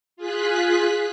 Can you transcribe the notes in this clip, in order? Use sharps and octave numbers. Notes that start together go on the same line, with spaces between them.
F4 G#4 F#6 B6